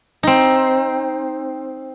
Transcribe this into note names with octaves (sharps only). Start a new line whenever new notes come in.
C4 D#4